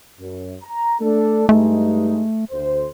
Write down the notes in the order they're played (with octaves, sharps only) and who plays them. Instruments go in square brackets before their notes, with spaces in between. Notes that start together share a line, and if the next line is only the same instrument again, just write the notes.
[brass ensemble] F#2
A#5
A3 D4 A4
[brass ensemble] G2 G#3 D#4 [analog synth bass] A3
[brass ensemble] D2 C5